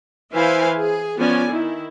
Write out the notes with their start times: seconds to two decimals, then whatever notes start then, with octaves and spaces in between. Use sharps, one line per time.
0.33 E3 E4 B4 C5 F5 G#5
0.78 G#4
1.19 F3 B3 C#4 D5 G#5
1.51 D#3 E4